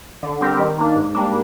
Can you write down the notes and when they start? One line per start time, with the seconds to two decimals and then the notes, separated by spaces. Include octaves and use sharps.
0.23 D3
0.41 G3 C4 G4 A#4
0.59 D#3
0.78 A#3 D4
0.96 G#2
1.15 G3 A#3 D4